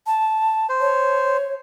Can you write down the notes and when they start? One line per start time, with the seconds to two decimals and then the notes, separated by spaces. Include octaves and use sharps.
0.07 A5
0.69 C5
0.81 C#5